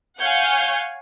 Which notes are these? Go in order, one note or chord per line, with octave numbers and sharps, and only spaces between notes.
C#5 F5 F#5 G#5 G6